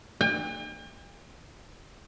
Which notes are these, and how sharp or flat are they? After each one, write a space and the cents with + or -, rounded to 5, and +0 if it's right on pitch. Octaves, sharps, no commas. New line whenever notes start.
G5 +45